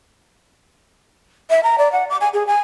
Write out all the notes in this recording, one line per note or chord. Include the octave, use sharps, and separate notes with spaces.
E5
A#5
D5
F#5
D6
G#5
G#4
G#5